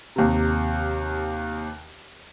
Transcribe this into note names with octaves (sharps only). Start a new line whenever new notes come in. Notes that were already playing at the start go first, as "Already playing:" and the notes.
D#2 C3